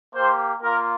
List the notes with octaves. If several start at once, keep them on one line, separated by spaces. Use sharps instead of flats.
A#3 G4 C5
A#3 F4 A#4